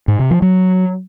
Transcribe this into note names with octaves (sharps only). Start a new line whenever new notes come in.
G#2
C3
F3
F#3